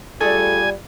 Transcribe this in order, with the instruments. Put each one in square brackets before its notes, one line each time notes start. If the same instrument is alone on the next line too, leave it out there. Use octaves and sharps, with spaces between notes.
[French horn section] G3 F4 D5 [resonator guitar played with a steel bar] A3 G#4 A4 [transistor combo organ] G#5